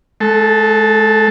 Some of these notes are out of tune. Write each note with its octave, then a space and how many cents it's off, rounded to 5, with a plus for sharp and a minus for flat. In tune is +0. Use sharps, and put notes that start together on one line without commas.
G#3 +40 A4 +0